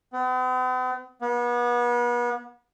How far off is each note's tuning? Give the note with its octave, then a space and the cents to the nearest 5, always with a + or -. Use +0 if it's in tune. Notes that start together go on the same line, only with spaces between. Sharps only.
B3 +45
B3 -35